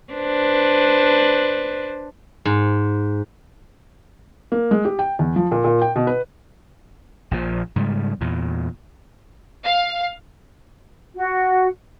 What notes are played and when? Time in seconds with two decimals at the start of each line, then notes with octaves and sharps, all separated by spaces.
0.13 D4 B4 C5
2.45 G#2
4.52 A#3
4.71 G#3
4.85 G4
4.99 G5
5.19 E2
5.36 F3
5.52 A#2
5.64 A#2
5.82 G5
5.96 B2
6.07 B4
7.31 A#1 A#2 F3
7.76 G#2 C#3 G3
8.21 E2 A#2
9.64 F5
11.16 F#4